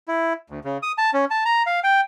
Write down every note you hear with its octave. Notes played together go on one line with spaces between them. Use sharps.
E4
D2
C#3
D#6
A5
C#4
A5
A#5
F5
G5